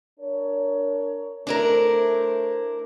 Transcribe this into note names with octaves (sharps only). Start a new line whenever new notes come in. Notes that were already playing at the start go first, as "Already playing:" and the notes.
D4 A#4 C#5
A3 D4 E4 A#4 C5